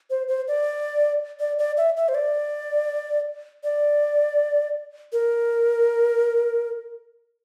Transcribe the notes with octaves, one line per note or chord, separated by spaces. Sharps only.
C5
C5
D5
D5
D5
E5
E5
C5
D5
D5
A#4